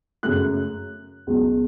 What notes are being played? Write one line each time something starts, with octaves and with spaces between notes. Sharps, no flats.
F#2 C#3 F#3 A3 F#6
C#2 B2 F#3